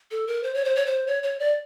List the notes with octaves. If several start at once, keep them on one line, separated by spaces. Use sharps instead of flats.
A4
A#4
C5
C#5
C5
C#5
C5
C#5
C#5
D5